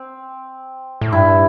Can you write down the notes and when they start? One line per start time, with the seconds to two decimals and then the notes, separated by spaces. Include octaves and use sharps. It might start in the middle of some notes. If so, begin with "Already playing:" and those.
Already playing: C4
1.01 A2
1.12 G2 E4